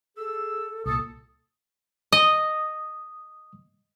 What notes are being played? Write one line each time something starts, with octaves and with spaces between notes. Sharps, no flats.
G#4 A4 E6
C2 A#2 A4 D#6
D#5 D#6